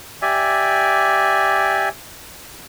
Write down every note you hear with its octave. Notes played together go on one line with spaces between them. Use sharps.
G4 D5 E5 G#5